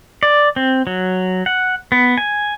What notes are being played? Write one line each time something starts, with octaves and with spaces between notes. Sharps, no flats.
D5
C4
F#3
F#5
B3
G#5